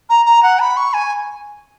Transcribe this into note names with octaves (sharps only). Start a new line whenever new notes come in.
A#5
A#5
F#5
B5
C#6
G#5